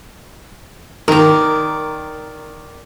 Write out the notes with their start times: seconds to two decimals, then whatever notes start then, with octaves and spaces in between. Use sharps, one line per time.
1.08 D#3 A#4 D5